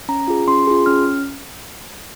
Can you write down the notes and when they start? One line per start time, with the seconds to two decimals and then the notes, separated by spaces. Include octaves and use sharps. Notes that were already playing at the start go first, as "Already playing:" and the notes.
0.09 C#4 A#5
0.28 F4 G#4
0.48 C#4 C6
0.67 F4 G#4
0.86 C#4 F6